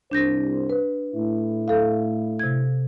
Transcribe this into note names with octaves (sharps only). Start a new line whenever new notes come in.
C2 D4 C5 G6 A#6
B4
A2 E4
A4 F5
C3 G#6